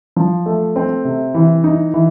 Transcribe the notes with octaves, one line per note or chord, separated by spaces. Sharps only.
F3
A3
C4
C3
E3
D#4
E3